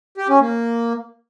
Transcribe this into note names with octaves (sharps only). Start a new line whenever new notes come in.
G4
C#4
A#3